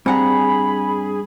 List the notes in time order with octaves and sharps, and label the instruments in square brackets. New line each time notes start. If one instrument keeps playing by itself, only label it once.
[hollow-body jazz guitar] G2 F#5 A#5 [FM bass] C4 [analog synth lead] G#4 [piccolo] B5